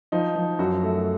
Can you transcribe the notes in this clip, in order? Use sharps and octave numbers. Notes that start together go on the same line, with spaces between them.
F3 D#4
F3
F#2 F#4
A3